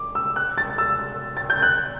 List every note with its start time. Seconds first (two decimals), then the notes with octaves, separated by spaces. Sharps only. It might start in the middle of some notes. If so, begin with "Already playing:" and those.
Already playing: D6
0.15 E6
0.36 F#6
0.58 A6
0.78 E6
1.37 A6
1.50 G6
1.63 F#6